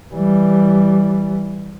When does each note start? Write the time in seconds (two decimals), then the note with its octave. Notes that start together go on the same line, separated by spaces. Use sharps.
0.14 E3 G3